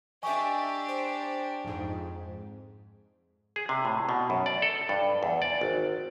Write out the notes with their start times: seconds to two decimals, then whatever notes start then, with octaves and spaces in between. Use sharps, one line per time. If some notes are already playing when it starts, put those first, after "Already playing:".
0.23 D4 G4 D#5 E5 G#5 C#6
0.89 C5
1.64 F2 G#2
3.56 G#4
3.69 C3
3.85 A2
4.09 B2
4.30 F#2
4.46 D5
4.62 A4
4.89 G2
5.23 E2
5.42 D5
5.61 G#1